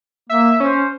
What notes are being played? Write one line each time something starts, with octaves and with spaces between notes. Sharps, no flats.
A#3 E5
C#4 C5